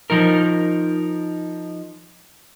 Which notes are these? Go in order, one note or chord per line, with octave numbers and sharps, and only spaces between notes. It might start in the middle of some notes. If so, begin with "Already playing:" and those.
F3 D#4 A#4